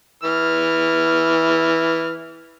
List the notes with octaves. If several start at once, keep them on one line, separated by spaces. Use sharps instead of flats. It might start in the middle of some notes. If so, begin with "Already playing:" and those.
E3 F6